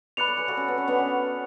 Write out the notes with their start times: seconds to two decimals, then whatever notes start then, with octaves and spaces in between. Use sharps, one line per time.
0.17 B4 D5 B5 F#6 C#7 F7
0.27 A4 C#5
0.37 G#4 B4
0.48 F#4 A4
0.57 C#4
0.68 B3
0.78 C#4
0.88 B3 D4
0.99 C#4